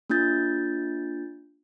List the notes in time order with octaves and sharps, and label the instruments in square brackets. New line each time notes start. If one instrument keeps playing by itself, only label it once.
[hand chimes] A#3 D4 F4 G6 A6